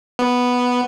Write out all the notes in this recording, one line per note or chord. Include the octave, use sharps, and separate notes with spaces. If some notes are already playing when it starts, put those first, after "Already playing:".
B3